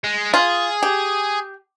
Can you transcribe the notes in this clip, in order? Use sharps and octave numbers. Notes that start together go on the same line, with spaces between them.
G#3
F4 G#4
G4